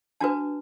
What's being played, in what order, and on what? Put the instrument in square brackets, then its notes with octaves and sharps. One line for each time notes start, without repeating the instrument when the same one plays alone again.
[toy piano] D4 F#4 B4 A5